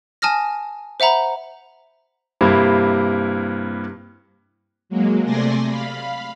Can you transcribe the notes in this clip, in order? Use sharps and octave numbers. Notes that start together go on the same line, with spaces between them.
G#5 A5 D#6 F6 A#6
C5 E5 F#5 A#5 B5
G2 C3 A#3 C4 E4
F#3 G#3 A#3
C3 A3 D5 G#5 C6 A#6
F5 B5